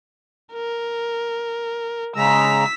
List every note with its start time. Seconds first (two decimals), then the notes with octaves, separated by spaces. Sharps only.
0.53 A#4
2.16 C#3 G#3 A#5 E6 B6